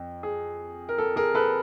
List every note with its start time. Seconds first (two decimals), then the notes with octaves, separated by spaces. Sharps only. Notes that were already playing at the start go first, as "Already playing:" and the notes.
Already playing: F2
0.23 G#4
0.89 A#4
0.98 A4
1.16 G#4 A#4
1.35 A4 B4